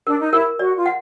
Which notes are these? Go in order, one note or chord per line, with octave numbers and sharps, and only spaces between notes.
D4 A#4
D#4
E4 A#4
F#4 D5
F4
F#5